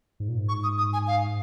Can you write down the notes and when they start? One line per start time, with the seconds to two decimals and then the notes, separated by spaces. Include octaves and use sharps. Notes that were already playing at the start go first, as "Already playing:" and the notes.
0.20 G#2
0.28 A#2
0.38 G#2
0.49 C#6
0.64 D#6
0.78 D#6
0.93 G#5
1.07 F5